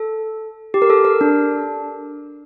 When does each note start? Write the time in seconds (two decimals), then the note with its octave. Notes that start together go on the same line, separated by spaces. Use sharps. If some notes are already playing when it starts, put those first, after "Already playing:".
Already playing: A4
0.74 G4
0.82 A#4
0.90 A4
1.05 A#4
1.21 D4